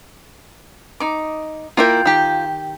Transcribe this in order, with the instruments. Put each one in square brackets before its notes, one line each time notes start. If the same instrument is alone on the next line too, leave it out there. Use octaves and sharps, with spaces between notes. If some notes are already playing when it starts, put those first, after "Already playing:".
[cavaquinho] D#4 D6
[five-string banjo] A#3 E4 A#4 [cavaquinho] F4 G5
[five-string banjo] D#3 G4